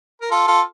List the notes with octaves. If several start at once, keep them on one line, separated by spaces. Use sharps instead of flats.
A#4
F4 A4
F4 A4